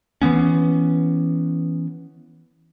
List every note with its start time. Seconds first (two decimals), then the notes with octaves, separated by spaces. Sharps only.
0.22 E3 F#3 B3 C#4